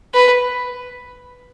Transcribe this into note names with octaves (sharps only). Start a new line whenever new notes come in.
B4